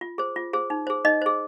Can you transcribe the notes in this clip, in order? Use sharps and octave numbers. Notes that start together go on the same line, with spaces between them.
F4
G#4 C5
F4
G#4 C5
D#4
G#4 C5
D#4 D#5
G#4 C5